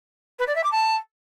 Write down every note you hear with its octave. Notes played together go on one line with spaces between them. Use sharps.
B4
D5
E5
D6
A5